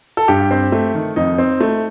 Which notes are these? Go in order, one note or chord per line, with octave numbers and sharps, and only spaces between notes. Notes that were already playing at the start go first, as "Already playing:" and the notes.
A4
G2 G4
C4
A3
D#3
F2 D#4
C4
A3